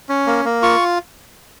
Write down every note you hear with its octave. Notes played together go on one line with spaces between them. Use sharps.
C#4
A#3
A#3
F4 C#6